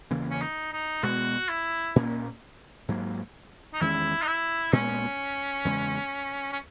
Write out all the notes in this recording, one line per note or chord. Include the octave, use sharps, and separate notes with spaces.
E2 C#3 E3 A#3
C#4
D#4
D#4
B2 G#3 B3 F#4
E4
A#2 A#3 C#4
G#2 F#3 A#3
D#4
E2 D#3 G#3 C#4 E4
D#4
E4
A#2 G#3 B3 C#4
E2 C#3 G#3
C#4